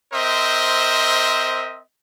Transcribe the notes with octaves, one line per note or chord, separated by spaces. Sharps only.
C4 A#4 C5 D#5 E5